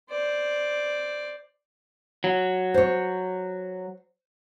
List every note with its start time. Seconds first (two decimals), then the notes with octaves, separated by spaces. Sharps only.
0.10 C5 D5
2.24 F#3
2.74 C5 C#5